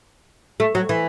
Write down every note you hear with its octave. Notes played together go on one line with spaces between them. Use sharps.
A3
F#3
E3